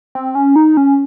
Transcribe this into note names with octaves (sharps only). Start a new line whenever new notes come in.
C4
C#4
D#4
C#4